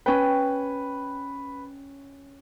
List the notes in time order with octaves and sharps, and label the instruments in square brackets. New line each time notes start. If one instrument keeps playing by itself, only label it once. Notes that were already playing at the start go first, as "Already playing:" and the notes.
[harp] C#4 G5 [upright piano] B4